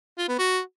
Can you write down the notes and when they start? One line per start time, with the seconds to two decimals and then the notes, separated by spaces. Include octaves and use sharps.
0.18 F4
0.28 B3
0.39 F#4